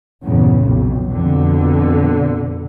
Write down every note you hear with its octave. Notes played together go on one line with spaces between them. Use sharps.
E2 G2 A#2 C#3
B1 F2
F2 B2 D3